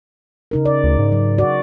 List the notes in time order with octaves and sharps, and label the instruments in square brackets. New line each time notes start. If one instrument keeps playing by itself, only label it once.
[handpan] C#3 D#4 A#4
D5
[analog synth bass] D2
G#2
[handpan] F#3
F#4 D5